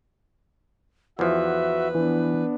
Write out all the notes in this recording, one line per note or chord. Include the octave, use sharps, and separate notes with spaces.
E2 F3 F#4 B4 E5
E3 B3 D4